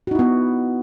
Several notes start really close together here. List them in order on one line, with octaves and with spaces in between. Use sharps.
F#4 D#4 E4 B3